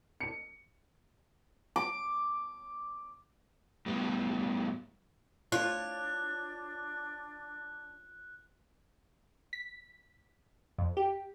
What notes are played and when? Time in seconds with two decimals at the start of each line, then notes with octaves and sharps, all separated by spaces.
0.20 C#7
1.76 D6
3.86 A2 G3 B3
5.52 D4 F4 C#5 F#6
9.53 B6
10.78 F2
10.97 G4